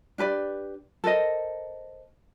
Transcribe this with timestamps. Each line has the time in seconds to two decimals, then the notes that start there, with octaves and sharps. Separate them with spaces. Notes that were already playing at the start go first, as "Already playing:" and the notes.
0.18 D4 G4 B4 D5
1.04 A4 A#4 C5 D#5